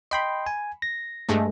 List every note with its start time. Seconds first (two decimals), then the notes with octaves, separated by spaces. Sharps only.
0.11 D#5 G5 B5 C6
0.47 G#5
0.82 A#6
1.29 G2 G#3 A3